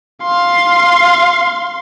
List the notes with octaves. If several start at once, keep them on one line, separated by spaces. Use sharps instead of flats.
F5 C6